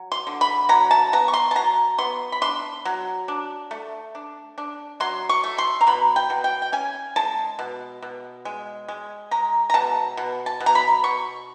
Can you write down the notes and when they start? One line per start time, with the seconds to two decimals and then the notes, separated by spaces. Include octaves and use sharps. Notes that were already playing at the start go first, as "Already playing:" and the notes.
Already playing: F#3
0.12 C6
0.27 D3
0.41 B5
0.69 F#3 A#5
0.91 A5
1.13 B3 A#5
1.28 C#6
1.34 C6
1.51 A5
1.55 F#3 A#5
1.98 B3 C6
2.32 B5
2.42 D4 C6
2.85 F#3
3.28 D4
3.71 A3
4.15 D4
4.58 D4
5.00 F#3 C6
5.29 C#6
5.44 A3
5.58 C6
5.81 A#5
5.87 B2 B5
6.16 G5
6.30 B2
6.44 G5
6.62 G5
6.72 C#4 G#5
7.16 G#3 A5
7.59 B2
8.02 B2
8.45 G#3
8.88 G#3
9.31 G#3 A#5
9.70 A#5
9.74 B2 A5
10.17 B2
10.46 A5
10.60 B2
10.66 A#5
10.75 B5
11.04 B2 C#6